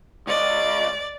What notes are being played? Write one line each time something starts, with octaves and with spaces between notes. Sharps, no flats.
C#2 D5 D#5